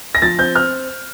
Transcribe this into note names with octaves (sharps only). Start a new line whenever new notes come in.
A#6
F3 A6
C4 G6
C4 F6